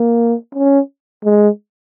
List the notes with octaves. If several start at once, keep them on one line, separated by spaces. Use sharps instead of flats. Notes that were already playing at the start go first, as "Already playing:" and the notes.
Already playing: A#3
C#4
G#3